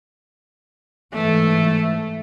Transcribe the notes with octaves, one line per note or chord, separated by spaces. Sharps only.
G#2 E3 A3